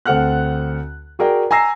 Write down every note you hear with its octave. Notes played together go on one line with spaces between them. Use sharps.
D2 C4 A4 F#5 F6 F#6
F#4 G#4 A#4 D5 G5
G#5 A#5 E6 A#6 C7